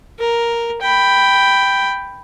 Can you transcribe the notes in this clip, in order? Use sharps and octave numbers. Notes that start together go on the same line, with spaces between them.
A#4
G5 B5